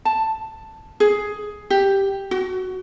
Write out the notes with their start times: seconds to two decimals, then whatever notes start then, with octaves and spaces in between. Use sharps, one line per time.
0.05 A5
1.00 G#4
1.70 G4
2.31 F#4